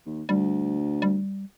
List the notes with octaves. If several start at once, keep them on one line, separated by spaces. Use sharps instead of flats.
D#2
D2 G3
G3